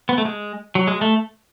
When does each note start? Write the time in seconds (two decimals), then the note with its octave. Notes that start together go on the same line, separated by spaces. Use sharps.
0.09 B3
0.18 A3
0.25 G#3
0.75 F#3
0.87 G#3
1.01 A3